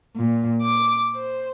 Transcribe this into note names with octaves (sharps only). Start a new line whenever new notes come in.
A#2
D6
C5